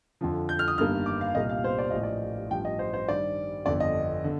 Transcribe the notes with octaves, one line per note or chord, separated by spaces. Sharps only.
F2 D3 F3
G6
F6
D#6
G1 G2 D#3 A#3 F6
D6
F5
C2 A#2 G3 A#3 D#5
F5
C5
D5
A1 A2 F3 D#5
D5
A1 G2 F3 G5
D#5
C5
C5
G2 D#3 G3 D5
G1 F2 D3 D5
D#5
D3